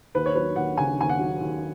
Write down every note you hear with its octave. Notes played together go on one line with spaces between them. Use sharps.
D#2 B4
C#5
F#3 B4
D#2 F#5
C#3 G#5
D#2 G#5
F#5
F#3
D#2